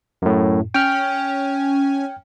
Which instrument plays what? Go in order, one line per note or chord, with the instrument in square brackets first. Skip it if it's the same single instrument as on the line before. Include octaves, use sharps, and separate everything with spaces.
[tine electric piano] F#2 A2
[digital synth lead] C#4 [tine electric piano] G5 F6